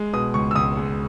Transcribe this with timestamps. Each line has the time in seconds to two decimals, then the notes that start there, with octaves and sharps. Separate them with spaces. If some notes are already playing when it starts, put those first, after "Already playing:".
Already playing: G#3
0.13 B2 D#6
0.34 C#2 C#6
0.51 E6
0.55 C#2 D#6
0.77 G#3